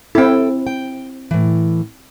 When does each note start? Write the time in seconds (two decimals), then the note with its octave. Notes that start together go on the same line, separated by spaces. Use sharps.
0.15 C4 E4 A4 G5
0.67 G5
1.31 A2 E3